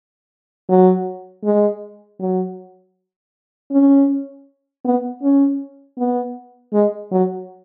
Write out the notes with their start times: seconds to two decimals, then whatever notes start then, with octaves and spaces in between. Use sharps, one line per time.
0.69 F#3
1.44 G#3
2.20 F#3
3.71 C#4
4.85 B3
5.22 C#4
5.98 B3
6.74 G#3
7.12 F#3